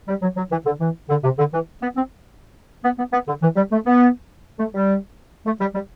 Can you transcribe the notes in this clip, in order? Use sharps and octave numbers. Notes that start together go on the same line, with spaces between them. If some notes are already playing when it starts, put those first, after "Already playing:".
G3
F#3
F#3
E3
D3
E3
D3
C3
D3
E3
B3
C4
B3
B3
B3
D3
E3
G3
A3
B3
A3
G3
A3
G3
G3